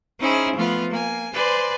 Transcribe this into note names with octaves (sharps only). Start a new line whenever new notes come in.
C#4 D#4 E4 G#4 C5
F3 A3 B3 F4
A#3 G#5
B4 C5 D5 G#5 C6